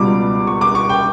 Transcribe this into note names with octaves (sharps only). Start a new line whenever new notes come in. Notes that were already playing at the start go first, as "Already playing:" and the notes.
Already playing: C#2 B2 G3 D6
C#6
D6
C#6
G5